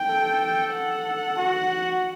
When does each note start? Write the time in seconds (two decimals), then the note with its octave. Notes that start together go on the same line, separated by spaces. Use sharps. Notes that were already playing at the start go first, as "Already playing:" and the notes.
Already playing: G5
0.10 A4
0.74 F#5
1.37 F#4